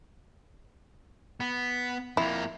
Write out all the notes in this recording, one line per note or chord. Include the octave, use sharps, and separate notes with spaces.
B3
F2 A#3 E4